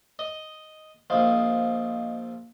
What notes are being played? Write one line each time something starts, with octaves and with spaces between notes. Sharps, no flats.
D#5
A#1 F3 D#5 F5 D#6